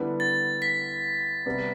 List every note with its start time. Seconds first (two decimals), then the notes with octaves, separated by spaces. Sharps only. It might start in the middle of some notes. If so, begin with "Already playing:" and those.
Already playing: D3 G3 B3 E4
0.20 A6
0.62 B6
1.46 C3 G3 B3